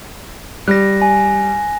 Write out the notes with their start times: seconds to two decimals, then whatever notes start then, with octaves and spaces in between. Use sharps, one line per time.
0.68 G3 F#6 A#6
1.02 G#5